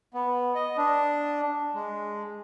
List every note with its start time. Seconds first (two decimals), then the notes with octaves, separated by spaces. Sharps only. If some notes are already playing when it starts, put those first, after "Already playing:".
0.14 B3
0.55 D#5
0.77 D4
1.74 G#3